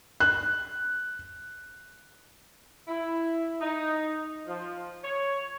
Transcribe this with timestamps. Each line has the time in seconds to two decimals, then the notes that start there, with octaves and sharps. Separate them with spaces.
0.20 F#6
2.88 E4
3.60 D#4
4.47 F3
5.03 C#5